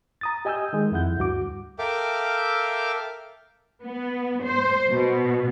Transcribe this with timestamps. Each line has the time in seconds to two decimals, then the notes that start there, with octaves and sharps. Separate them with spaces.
0.21 A#5 D#6 A6
0.45 G4 D#5 G#5 D#6 E6 G6
0.73 D#3 G#3
0.92 F2 E4 F#5 G6
1.18 D2 G2 F#4 D6
1.79 A4 A#4 E5 F5 G5 D6
3.84 B3
4.46 C5
4.90 B2